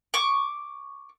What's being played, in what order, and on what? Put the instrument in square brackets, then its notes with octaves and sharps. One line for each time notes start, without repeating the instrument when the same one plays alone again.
[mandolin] C#6 D6